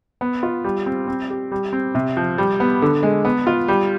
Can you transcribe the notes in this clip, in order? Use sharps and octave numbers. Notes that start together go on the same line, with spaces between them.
B3
F4
G3
C4
C4
G4
G3
C4
C3
F3
G3
B3
D3
G#3
B3
F4
G3